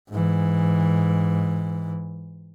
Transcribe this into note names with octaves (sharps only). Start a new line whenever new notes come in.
G#2 E3